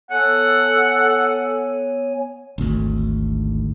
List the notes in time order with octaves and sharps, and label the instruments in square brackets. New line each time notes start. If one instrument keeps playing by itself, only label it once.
[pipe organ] B3 C#5 G#5 [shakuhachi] A4 [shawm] F#5
[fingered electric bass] G#1 D2